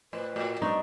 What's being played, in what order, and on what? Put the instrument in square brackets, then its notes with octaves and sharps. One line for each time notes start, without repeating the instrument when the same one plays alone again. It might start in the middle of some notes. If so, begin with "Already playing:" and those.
[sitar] A2 [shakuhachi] B4 [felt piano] C5
[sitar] A2 [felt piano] F#4 A#4 D6
[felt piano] G2 B3 C4 [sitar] D4 [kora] D#4 [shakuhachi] C#6